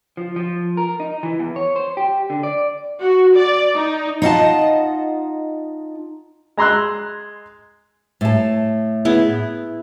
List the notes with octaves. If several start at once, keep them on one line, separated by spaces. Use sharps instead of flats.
F3
F3
A#4
D#4
E3
E2
C#5
C5
G4
D3
D5
F#4
D5
D#4
D#4 F4 D#5 F5 F#5 A5
G#3 A#5 C6 E6 F#6
A2 A5
B3 E4 G#4